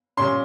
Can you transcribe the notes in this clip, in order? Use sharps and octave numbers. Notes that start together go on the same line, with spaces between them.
A#2 G3 C#4 C6